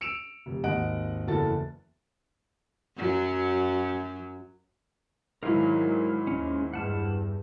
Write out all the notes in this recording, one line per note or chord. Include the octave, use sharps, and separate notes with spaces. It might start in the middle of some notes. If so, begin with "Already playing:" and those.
E6 C#7 D7 E7 F7
F1
G#1 D#2 D#5 F#5 F#6 D7
F#1 E2 F#4 A4 A5 A6
F#2 F#3
G#2 D#3 F#3 G#3 E4 A#4 F5 G#5
D#2 G#3 C#4
E2 G2 F#5 A5 F6